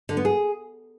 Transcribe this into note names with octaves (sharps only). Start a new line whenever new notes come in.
D3
B3
G#4